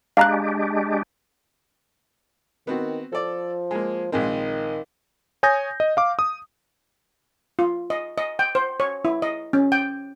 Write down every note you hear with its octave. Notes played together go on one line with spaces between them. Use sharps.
G#3 D4 G4 F5 A#5 F#6
D#3 B3 C4 F#4
F3 A4 D5
G#3 A#3
A#1 D#3 G#3 C4
C#5 G#5 D#6 G6 A#6
D#5
F5 D6
D#6
F4
D#5
D#5
G5
C5
C#5
E4
D#5
C#4
G5